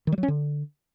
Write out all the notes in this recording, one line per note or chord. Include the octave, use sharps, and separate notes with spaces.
D#3
G3
F#3
C#4
D3